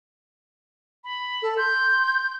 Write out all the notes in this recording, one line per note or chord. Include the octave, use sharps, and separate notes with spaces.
B5
A4
C6 G6